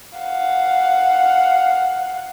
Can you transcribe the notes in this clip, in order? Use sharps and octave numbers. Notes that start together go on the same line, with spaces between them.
F5 F#5